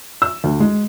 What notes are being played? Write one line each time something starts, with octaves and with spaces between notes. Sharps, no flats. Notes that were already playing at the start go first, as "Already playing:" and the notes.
E6
D2
G#3